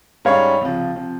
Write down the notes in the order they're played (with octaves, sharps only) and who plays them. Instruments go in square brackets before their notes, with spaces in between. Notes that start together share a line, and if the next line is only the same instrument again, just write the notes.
[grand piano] G#2 G3 C#4 [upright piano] C#5 F5
[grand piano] C#2 C3 F3
C3 F3